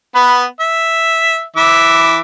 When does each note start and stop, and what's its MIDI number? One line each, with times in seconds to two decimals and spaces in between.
0.15 0.45 59
0.15 0.45 71
0.60 1.42 76
1.57 2.19 52
1.57 2.19 76
1.57 2.19 86